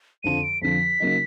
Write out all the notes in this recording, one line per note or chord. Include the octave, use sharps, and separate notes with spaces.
F2 D3 F3 D#7
D7
F2 D3 F3 B6
C#3 F#3 A#3 D#4